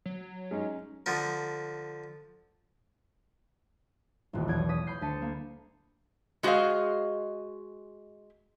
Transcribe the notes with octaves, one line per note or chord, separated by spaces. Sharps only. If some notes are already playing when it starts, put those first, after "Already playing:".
F#3
G#3 C#4 D#4
D3 F3 A#4
D#1 A1
B1 E2 D#6 G#6 D7
D#6 A#6 B6 D#7
B5 G6 C7
D2 A5 B6 C#7 D#7
A#3
G#3 F#4 G#4 C5 D#5 F5